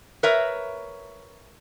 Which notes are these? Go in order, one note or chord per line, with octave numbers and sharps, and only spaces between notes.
A#4 B4 C#5 E5 A#5